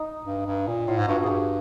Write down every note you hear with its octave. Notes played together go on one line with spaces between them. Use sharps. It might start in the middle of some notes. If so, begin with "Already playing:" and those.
Already playing: D#4
G2
G2
A#2
A2 F4
G#2
G2 F#4
G2
G#2 G#4
G2 G4